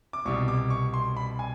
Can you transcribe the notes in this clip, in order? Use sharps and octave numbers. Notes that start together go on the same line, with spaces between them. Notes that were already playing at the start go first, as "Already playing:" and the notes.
D6
C2 B2 G3 C#6
D6
C#6
C6
B5
G#5